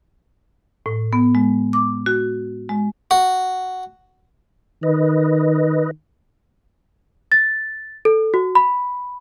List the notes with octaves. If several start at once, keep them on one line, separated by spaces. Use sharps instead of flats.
A2
B3
G#3
D6
F#4
G#3
F#4
D#3 B4 D#5
A6
A4
F#4
B5